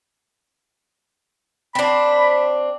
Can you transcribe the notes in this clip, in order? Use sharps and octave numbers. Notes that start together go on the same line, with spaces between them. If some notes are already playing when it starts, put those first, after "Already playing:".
C4 D4 B5